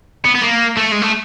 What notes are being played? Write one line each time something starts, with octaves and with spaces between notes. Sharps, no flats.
B3
B3
A#3
A3
G#3
A3